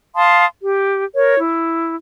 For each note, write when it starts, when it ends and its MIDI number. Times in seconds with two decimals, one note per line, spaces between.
0.16 0.45 77
0.16 0.45 81
0.16 0.45 84
0.16 0.45 87
0.62 1.03 67
1.15 1.38 70
1.15 1.38 73
1.40 1.95 64